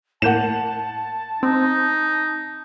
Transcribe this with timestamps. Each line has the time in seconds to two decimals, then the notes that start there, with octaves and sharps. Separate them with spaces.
0.22 A2 A#3 F#5 A5 G6 E7
1.43 C4 D#4